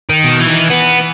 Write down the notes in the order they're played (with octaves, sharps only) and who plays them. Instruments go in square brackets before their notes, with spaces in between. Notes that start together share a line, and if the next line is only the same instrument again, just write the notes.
[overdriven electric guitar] D#3
[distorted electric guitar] B2
[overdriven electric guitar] E3
[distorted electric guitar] D#3
[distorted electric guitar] E3 [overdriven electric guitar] B3